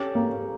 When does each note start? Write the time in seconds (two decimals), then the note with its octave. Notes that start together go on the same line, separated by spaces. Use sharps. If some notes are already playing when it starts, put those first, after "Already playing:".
Already playing: C#4 G4 A4
0.15 A#3